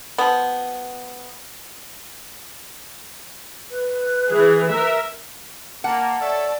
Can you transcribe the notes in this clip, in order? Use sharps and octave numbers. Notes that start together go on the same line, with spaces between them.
F3 B3
B4
E3 G#4
A#4 E5
A#3 F#5 A5
A4 C#5 D5 E5